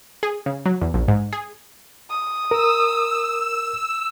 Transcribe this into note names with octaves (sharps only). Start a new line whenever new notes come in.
G#4
C#3
F#3
E2
A#1
G#2
G#4
D#6
A#4 E6